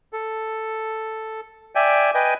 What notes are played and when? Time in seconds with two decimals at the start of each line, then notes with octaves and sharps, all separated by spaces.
0.13 A4
1.75 D5 E5 G5 G#5
2.14 B4 D#5 G5 G#5